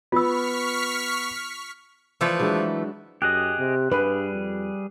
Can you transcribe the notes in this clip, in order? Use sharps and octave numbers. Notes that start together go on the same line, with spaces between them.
B3 F4 C#6 E6 F6 B6
E3 F3 A3 B4
F#3 G#3 D4
F#2 G4 G#4 D#5 F#6
C3
G2 G3 G#4 B4
F2